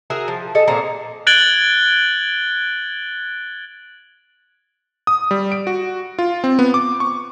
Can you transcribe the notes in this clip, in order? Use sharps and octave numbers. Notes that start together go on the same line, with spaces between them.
F#4 G#4 A#4 E5
F3
G#4 A4 D#5
A#2 C4 G#4 A#5
F#6 G#6 A6 D7 F#7 G7
D#6
G3
D7
F#4
F4
C4
B3
D6
C#6